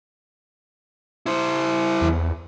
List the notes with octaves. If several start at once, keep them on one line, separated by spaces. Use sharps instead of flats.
E4 C5
E2